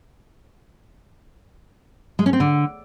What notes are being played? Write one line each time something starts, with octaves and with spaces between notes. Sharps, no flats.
G#3
C#4
C4
D3